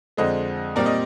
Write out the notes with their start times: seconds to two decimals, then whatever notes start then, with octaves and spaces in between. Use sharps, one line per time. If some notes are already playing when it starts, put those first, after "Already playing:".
0.17 F2 D3 G#3 C5 D#5
0.76 A#2 G3 C4 A#4 D5
0.86 D#5